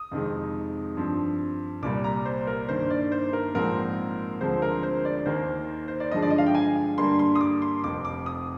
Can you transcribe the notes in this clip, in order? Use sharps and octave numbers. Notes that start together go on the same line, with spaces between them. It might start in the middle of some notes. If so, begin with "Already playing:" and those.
Already playing: D#6
F2 C3 D#3 G#3
G2 F3 C4
C2 A#2 G3 D6
A#5
C5
A#4
G2 D#3 A#3 C5
D5
C5
A#4
A#1 G#2 F3 C4 A#4
D2 D3 F3 G#3 C4 C5
A#4
C5
D5
D#2 D#3 A#3 C5
C5
D5
G2 D3 F3 G#3 D#5
D5
D#5
F5
G5
G#5
G2 D3 G3 A#3 C6
C6
D#6
D6
C6
F1 F2 C3 D6
D6
D#6